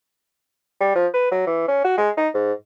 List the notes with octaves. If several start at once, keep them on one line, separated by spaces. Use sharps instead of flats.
G3
F3
B4
F#3
E3
C#4
F#4
G#3
D#4
G#2